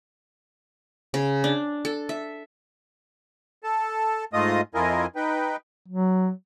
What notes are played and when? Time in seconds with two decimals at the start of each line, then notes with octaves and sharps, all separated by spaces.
1.14 C#3
1.44 D4
1.85 A4
2.09 E5
3.64 A4 A5
4.33 G#2 A3 F4 D#5 D#6
4.75 F2 E4 F4 A#4 D#5 G#5
5.16 D#4 B4 G5
5.88 F#3